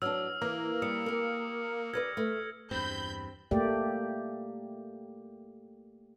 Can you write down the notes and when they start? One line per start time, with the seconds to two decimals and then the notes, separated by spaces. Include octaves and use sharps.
0.02 F#3 B3 D4 E6 F6
0.41 E3 A#3
0.82 G3 D#6 C#7
1.06 G4 A#4
1.93 G4 B4 D5 F6 G#6 A#6
2.17 A3
2.71 E2 G2 C4 B5 G6
3.51 A3 A#3 G4 D5